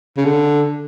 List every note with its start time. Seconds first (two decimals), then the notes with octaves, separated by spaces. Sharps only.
0.17 C#3
0.25 D3